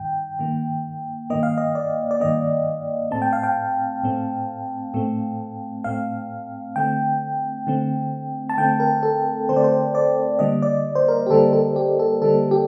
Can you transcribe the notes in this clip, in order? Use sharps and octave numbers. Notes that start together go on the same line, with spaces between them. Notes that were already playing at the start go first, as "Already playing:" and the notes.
Already playing: G2 D#3 G5
G2 D#3 A#3
G2 D#3 A#3 D#5
F5
D#5
D5
D5
G2 D#3 A#3 D#5
A2 A3 C4 A5
G5
F5
G5
A2 A3 C4
A2 A3 C4
A2 A3 C4 F5
D3 A3 C4 G5
D3 A3 C4
A5
D3 A3 C4 G5
A#4
A4
D3 A3 C4 C5
D5
C5
D5
D3 G3 A#3 D#5
D5
C5
A#4
G4
D3 G3 A#3 A4
A4
G4
A4
D3 G3 A#3 A4
G4